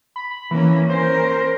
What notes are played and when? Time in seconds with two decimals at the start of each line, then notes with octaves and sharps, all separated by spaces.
0.16 B5
0.51 E3 A#3 C#4
0.90 C#4 A#4 C5